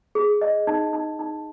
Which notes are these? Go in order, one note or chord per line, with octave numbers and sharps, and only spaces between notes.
G#4
D#5
D#4
D#4
D#4